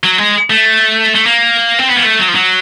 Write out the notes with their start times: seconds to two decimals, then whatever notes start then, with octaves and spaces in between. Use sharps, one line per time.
0.04 F#3
0.18 G#3
0.50 A3
1.15 A3
1.26 A#3
1.79 C4
1.89 B3
1.96 A#3
2.03 A3
2.19 F#3
2.28 F3
2.35 F#3